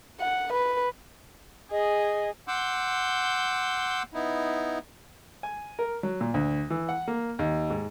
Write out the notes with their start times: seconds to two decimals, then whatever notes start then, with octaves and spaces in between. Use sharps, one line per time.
0.20 F#5
0.53 B4
1.72 G#4 D#5
2.48 F#5 C6 D6 E6 G6
4.14 B3 D#4 E4
5.43 G#5
5.79 A#4
6.03 F#3
6.21 A#2
6.34 D2
6.70 E3
6.89 F#5
7.08 A#3
7.39 D#2
7.70 G#2